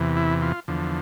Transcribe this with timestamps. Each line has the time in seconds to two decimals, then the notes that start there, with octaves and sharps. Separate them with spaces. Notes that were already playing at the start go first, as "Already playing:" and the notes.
Already playing: E2 C3 E3
0.17 E4
0.42 F4
0.68 E2 D3 F3